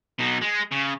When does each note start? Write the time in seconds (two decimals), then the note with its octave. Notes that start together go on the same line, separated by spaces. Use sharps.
0.19 B2 D#4
0.42 G#3
0.72 C#3